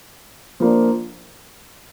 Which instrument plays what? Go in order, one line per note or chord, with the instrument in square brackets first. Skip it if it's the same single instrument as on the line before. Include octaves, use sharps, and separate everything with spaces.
[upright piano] F3 A#3 D4